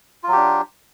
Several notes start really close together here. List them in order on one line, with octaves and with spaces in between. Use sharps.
F4 F#3 G4 D4